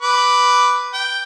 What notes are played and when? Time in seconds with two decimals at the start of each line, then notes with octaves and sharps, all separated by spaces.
0.02 B4 D6
0.94 G5